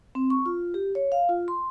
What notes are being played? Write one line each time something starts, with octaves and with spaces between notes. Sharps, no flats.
C4
C#6
F4
G4
C#5
F5
F4
C6